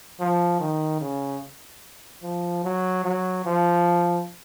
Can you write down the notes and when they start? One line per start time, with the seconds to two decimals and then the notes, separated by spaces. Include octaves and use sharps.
0.20 F3
0.60 D#3
1.01 C#3
2.23 F3
2.64 F#3
3.04 F#3
3.45 F3